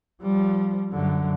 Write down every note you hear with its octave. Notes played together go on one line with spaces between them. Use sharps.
F3 G3
F#2 D3